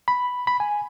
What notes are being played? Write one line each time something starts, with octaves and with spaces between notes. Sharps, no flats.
B5
B5
G#5